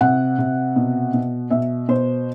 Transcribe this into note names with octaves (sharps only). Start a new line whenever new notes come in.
C3 F#5
C3
B2
B2
B2 E5
B2 C5